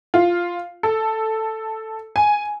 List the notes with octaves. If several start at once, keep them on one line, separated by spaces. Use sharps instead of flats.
F4
A4
G#5